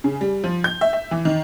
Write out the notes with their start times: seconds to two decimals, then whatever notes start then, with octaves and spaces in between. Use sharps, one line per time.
0.04 C#3
0.21 G3
0.44 F3
0.64 G6
0.81 E5
0.93 E5
1.11 E3
1.25 D#3